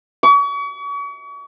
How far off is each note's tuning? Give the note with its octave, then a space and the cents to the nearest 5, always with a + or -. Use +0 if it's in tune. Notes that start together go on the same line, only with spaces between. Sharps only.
C#6 +40